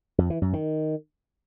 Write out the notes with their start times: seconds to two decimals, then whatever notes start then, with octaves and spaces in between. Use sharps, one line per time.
0.18 F2
0.30 E3
0.42 F#2
0.53 D#3